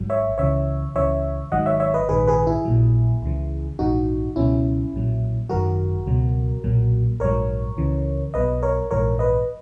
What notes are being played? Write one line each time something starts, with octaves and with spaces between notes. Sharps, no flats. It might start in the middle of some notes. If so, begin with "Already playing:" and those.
Already playing: G#1 G#2 F#3
C#5 E5
C#2 C#3 E3 C#5 E5
C#2 C#3 E3 C#5 E5
G#1 G#2 D#3 F#3 D#5 F#5
C#5 E5
C#5 E5
B4 D#5
A#1 G#2 D#3 G#4 B4
G#4 B4
E4 G#4
A#1 A#2 F#3
C#2 C#3 E3
A#1 G#2 E3 D#4 F#4
C#2 B2 F#3 C#4 E4
B1 A#2 F#3
G#1 F#2 D#3 F#3 F#4 A#4
C#2 B2 F#3
B1 A#2 F#3
A#1 G#2 F#3 A#4 C#5
C#2 C#3 E3
B1 B2 F#3 B4 D#5
A#4 C#5
A#1 G#2 E3 A#4 C#5
B4 D#5